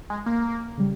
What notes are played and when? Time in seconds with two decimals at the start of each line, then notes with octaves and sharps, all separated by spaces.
0.10 G#3
0.26 A#3
0.77 C#3 G3